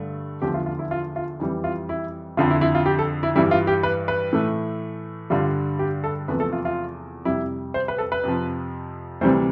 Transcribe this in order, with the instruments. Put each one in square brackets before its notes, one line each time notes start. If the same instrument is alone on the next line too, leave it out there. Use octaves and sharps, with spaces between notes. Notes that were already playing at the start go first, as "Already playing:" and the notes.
Already playing: [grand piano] G2 D3 A3
E2 D3 F3 A3 G4
F4
F4
E4
F4
F4
F2 E3 G3
F4
E4
F2 D3 F3 F4
E4
E4
F4
G4
A4
E4
G2 E3 G3 E4
F4
G4
B4
B4
A2 E3 A3
G2 D3 G3 F4
G4
A4
E2 C3 F3 A3 B4
A4
F4
F4
F2 C3 G3 E4
C5
B4
A4
B4
F2 C3 F3
D2 C3 E3 G3 C5